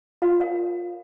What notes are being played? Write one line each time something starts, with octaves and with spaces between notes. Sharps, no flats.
F4 F5
A#4 C#5 F5